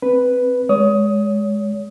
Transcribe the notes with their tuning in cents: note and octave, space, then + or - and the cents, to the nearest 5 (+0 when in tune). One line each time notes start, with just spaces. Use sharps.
C4 +0 B4 +0
G#3 +0 C#5 +35 D#6 +15